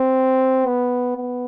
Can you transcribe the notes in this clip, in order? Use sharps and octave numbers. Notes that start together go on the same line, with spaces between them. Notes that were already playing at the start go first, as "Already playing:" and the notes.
Already playing: C4
B3
B3